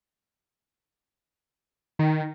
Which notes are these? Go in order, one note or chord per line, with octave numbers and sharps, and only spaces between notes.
D#3